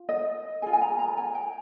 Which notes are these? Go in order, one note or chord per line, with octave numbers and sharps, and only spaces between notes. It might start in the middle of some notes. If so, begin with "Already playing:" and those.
Already playing: F4
D#5
F4 G#4 G#5
G#5
A#5
A#5
G#5
G5